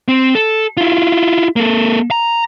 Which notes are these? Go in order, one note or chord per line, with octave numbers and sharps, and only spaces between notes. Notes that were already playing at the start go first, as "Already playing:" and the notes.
C4
A4
E4 F4
A#3 A4
A#5